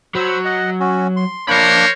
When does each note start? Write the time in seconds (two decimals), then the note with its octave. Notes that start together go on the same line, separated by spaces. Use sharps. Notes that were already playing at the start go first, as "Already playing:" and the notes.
0.15 F#3 C5 B5 E6
0.45 D#5 F#5
0.80 C#4 F#4
1.17 C6
1.48 F3 A#3 D4 A#4 C5 C#5 B5